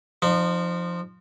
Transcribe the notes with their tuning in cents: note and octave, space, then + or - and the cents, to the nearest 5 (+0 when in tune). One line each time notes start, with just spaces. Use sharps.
F3 +0 D#4 -40